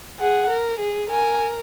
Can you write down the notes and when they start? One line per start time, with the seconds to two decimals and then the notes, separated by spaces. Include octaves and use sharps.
0.19 G#4 F#5
0.50 A#4
0.80 G#4
1.10 A#4 G#5